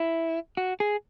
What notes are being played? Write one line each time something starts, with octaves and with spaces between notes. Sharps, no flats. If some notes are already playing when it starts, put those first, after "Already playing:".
Already playing: E4
F#4
G#4